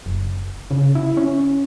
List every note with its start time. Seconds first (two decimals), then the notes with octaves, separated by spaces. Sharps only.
0.06 F#1
0.71 C#3
0.95 E4
1.17 C#4